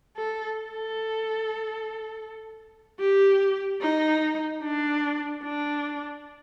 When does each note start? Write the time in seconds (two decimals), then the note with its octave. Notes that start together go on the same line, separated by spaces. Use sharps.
0.17 A4
0.58 A4
3.00 G4
3.82 D#4
4.63 D4
5.43 D4